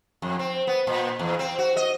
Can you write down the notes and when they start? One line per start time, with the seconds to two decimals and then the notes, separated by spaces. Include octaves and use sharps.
0.22 F2
0.39 C4
0.67 B3
0.87 A#2
1.19 E2
1.39 C4
1.59 F#4
1.77 D#5